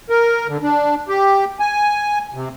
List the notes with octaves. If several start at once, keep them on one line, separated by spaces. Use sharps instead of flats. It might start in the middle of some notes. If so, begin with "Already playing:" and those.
A#4
D3
D4
G4
G#5
C3